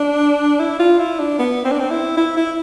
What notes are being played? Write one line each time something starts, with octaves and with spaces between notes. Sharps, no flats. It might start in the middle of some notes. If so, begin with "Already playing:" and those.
Already playing: D4
E4
F4
E4
D4
B3
C4
D4
C4
E4
E4
E4